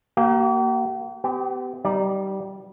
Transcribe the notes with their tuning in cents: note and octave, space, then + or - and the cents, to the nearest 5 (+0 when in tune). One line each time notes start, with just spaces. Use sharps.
A#3 +0 G4 -45 F5 +0
B3 +40 G4 -15
G3 -20 D#4 +0 D5 +0